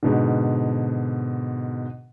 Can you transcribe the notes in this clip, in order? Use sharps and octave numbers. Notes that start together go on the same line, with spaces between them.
G#2 B2 D3